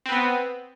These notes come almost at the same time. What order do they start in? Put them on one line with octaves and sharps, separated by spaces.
C4 B4 B3